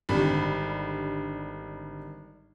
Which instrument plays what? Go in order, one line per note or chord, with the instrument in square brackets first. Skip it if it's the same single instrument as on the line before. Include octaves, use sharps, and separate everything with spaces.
[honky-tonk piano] G#1 D3 G3 B5